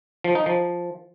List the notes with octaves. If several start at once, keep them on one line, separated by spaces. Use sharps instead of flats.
F3
D#4
F3